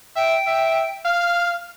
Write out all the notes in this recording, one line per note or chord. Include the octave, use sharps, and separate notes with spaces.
E5 G5
E5
F5 F6